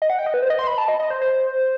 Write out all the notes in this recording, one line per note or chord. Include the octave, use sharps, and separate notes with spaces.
D#5
F#5
G5
D#5
B4
C5
D#5
C6
B5
A5
D#5
D#5
C5
C5